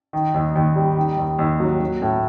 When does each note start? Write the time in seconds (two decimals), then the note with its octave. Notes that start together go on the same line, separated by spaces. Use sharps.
0.13 D#3
0.34 D#2
0.55 D#2
0.76 G3
0.97 D#3
1.17 D#2
1.39 D#2
1.60 F#3
1.80 F#3
2.02 A2